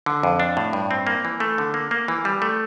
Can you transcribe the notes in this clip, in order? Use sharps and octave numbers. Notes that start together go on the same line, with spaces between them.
D3
F2
D4
A2
G2
C4
A#3
E3
A3
D3
A#3
A#3
E3
G3
A3